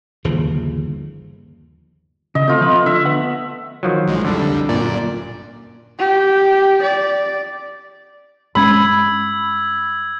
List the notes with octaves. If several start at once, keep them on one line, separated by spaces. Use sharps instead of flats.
G1 D#2 C#3 F3
C#3 D#5
A3 C4 F4
F3 B3 B4
D3 E5
B3 B4 F#5
D#3 F3 F#3
A#1 G#3
C2 F2 D3 G3 D4
G1 F#2 A#2 D5
G4
D5
G2 G#3 C#4 B5 E6 G#6